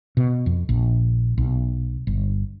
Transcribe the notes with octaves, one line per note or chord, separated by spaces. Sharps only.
B2
F2
A#1
B1
G1